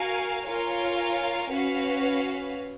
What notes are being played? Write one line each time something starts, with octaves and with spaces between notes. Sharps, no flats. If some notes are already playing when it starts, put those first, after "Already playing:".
Already playing: F#4 A#4 F5 G#5
F4 A#4 C#5 F5 G#5
C#4 F#4 B4 F5